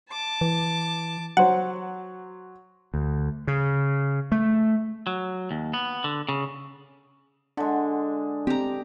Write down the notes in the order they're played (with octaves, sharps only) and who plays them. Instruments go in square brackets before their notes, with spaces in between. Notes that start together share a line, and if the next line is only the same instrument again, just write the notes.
[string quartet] A5 D6
[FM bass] E3
[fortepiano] F#3 C5 [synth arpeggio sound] F#5
[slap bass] D2
C#3
A3
[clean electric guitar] F#3
D#2
B3
D3
C#3
[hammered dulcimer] D3 G#3 [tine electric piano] D4
[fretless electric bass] C4 [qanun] G4 A#5